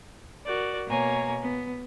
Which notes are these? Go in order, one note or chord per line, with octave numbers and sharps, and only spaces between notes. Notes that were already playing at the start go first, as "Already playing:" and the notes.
F#4 A#4 D5
B2 A#3 C#5 G#5 A#5
B3